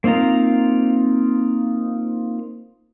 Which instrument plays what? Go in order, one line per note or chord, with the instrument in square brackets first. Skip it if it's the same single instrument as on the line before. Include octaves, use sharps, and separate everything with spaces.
[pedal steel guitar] A#3 C4 D#4 F4 A#5